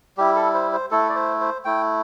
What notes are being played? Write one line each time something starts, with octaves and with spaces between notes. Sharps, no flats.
G3 E4 G4
A4
C5
C5
A3 E4 A4
D5
C5
C5
A3 E4 G5